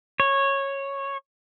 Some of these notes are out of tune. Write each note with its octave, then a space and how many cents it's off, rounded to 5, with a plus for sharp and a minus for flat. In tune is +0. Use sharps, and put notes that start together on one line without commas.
C#5 -10